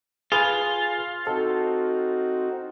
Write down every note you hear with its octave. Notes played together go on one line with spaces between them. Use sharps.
F4 G#4 B4 G#5
C4 D#4 F#4 A4